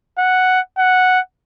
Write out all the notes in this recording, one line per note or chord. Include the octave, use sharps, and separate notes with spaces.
F#5
F#5